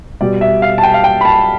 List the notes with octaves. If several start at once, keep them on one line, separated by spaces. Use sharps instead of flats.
B2 G3 D5
E5
F5
A5
G5
F5
G5
B5
A5